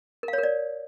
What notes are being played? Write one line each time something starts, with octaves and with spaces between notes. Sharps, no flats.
A#4
F5
C#5
A#4
D5